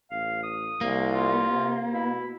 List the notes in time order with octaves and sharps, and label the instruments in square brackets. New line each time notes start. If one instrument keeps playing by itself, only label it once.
[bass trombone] A1 [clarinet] F5
[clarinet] D#6
[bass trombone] C2 [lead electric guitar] A#3
[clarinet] F4
[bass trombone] C3
[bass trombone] B2 [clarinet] E4